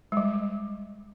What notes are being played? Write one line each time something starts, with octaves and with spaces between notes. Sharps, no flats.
G#3
G3